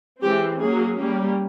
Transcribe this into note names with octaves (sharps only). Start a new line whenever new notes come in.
E3 G#3 C4 G4
F#3 A#3 C#4 G#4
G3 A#3 C#4